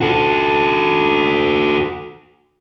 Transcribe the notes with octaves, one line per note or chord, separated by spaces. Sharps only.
F#4 A4